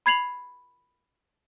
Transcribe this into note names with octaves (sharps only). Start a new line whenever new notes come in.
B5 G#6 C7 F7 F#7